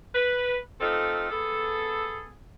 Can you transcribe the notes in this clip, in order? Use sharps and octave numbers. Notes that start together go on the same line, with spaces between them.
B4
A3 C4 D#4 F4 A4
B3 G#4 A4